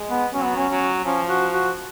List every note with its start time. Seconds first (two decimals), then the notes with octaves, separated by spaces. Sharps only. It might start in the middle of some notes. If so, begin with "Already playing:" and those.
Already playing: G#3
0.10 B3
0.34 F#3 C#4
0.44 B3
0.55 C#4
0.70 F#3
1.05 F3 C#4
1.29 F#4
1.53 F#4